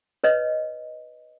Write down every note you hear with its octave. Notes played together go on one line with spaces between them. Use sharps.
B4 C#5 D#5